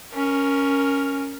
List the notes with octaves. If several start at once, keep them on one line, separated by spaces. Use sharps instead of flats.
C#4 A#4